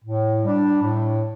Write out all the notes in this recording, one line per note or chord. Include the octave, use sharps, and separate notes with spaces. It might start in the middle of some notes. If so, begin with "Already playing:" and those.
A2
G3 D4
A2